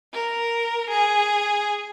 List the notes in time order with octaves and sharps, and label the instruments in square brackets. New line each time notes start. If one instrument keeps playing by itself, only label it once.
[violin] A#4
G#4